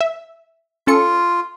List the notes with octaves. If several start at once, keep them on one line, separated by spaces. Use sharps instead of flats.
E5
C#4 F4 A4 C#7